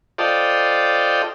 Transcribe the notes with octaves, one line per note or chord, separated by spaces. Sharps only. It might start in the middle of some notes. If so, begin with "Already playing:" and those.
F4 A4 C5 D5 D#5 G5